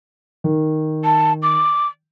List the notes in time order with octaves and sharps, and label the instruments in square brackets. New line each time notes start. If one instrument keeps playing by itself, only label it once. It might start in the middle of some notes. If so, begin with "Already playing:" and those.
[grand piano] D#3
[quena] A5
D6